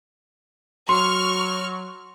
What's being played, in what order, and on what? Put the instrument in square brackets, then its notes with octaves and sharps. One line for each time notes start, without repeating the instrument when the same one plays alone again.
[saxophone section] F#3 [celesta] C6 [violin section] C#6 F6